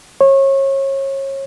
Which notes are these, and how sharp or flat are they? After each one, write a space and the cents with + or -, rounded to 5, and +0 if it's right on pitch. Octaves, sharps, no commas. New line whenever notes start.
C#5 -30